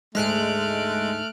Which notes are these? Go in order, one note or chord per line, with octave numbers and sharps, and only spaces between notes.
D2 G#2 G#3 A3 G#4 F6 F#6 D7